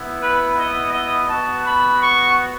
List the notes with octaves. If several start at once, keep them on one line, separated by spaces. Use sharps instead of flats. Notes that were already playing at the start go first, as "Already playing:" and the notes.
Already playing: B3 E4
B4
D#5
D#5
B3 F#4 A5
B5
C#6